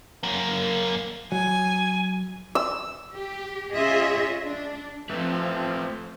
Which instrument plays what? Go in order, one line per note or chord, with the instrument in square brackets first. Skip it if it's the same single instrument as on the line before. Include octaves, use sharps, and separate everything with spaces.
[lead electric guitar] F#2 A#3
[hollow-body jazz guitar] F#3 [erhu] G#5
[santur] E6
[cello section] G4
C#4 F4 G#4 D#5 E5
D4
[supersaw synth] F3 C4 [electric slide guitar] A3 B4 E5